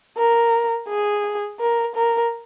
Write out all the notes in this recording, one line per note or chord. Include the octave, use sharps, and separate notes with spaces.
A#4
G#4
A#4
A#4